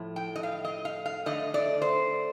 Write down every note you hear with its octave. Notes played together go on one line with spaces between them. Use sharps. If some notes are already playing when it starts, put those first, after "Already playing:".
Already playing: A2 F3 A3
G5
D#5
F5
D#5
F5
F5
D3 A3 D#5
D5
C5